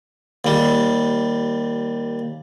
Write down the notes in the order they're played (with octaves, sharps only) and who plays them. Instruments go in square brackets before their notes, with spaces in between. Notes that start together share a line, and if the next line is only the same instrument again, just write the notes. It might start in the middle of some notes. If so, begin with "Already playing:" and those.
[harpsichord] D#2 G3